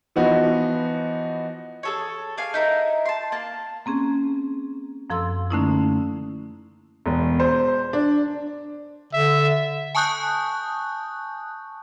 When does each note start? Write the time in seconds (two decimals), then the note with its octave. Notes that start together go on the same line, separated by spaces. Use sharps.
0.16 E3 F3 B3 D#4 F#4
1.83 G#4 A4 C#5
2.38 D5 F5 G#5
2.54 D#4 E4 A#4
3.05 A5 C6
3.32 A#3 A5
3.86 A#3 C4 C#4 G#4
5.10 F#2 F3 A4 C6 E6
5.50 D3 A3 A#3 C#4 D#4 E4
7.06 E1
7.40 C5
7.93 D4
9.13 D3 E5
9.95 G#5 A5 C#6 D#6 F#6 G6